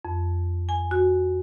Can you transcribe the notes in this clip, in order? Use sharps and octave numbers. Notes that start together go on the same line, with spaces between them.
F2
G#5
F#4